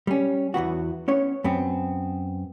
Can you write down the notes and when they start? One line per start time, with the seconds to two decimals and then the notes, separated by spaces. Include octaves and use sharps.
0.07 G3 C#4
0.54 E2 E3 B3 F#4
1.08 B3 C#4 C#5
1.44 F#2 B3 C4